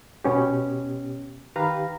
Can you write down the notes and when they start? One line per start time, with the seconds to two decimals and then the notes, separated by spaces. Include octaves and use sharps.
0.24 B2 B3 C#4 G4
1.56 D#3 G4 B4 F5 A#5